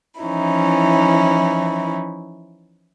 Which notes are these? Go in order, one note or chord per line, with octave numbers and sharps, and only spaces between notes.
E3 F3 C#4 D#4 E4